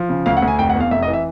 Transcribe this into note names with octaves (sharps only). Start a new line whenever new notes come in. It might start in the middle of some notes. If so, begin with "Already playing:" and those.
Already playing: F3
C#3
D2 F5
F#5
D2
G#5
F1 G5
F#5
E2
F5
F1 E5
D#5
E3
E5